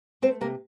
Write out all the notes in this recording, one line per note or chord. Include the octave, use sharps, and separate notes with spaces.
A3 C4 C5
C3 A#3 A#4